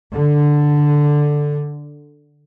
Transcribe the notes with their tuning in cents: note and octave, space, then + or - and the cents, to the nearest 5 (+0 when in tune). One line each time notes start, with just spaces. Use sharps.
D3 +0